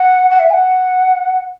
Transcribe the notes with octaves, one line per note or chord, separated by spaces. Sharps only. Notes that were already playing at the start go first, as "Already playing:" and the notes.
Already playing: F#5
F#5
E5
G#5
F#5